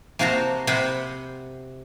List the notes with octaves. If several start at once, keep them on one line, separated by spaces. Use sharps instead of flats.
C3 A#3 F#4 C5 A5 A#5
C3 C5 F#5 B5